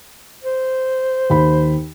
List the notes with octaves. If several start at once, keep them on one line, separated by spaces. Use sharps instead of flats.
C5
D#2 B5